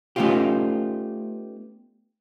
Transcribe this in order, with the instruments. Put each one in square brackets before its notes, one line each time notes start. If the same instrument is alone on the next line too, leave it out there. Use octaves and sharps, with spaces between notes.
[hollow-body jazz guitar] A3 B3 C#4 D#4 F4 G4